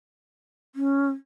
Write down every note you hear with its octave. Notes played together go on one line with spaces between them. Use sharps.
C#4